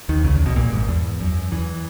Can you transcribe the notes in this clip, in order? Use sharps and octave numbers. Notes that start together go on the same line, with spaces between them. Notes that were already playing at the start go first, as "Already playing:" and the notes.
D#2 D#3
C#2 C#3
E2
B1 B2
A#1 A#2
G#1 G#2
E2
F#2
E2 E3